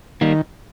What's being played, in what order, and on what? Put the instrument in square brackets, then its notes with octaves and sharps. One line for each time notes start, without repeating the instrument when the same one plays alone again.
[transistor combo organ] D#3 [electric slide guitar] G3 A#3